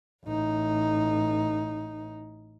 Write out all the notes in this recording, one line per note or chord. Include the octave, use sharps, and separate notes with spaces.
A1 D#4